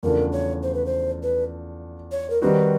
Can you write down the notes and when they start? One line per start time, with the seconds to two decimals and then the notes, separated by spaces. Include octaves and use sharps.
0.03 E2 C#3 F3 A3 D4 A#4
0.32 C#5
0.63 C5
0.74 B4
0.86 C5
1.23 B4
2.12 C#5
2.30 A#4
2.42 D#3 G3 C4 D#4 F#4 B4